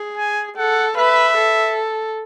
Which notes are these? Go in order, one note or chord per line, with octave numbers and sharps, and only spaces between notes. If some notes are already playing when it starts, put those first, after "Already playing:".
Already playing: G#4
G#5
A4 F#5
B4 E5
A4